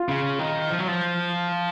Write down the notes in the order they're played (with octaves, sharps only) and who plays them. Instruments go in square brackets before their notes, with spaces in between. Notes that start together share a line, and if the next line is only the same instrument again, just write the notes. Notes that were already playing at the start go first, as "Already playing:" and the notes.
Already playing: [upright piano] F4
[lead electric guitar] C#3
D#3
F3
F#3
F3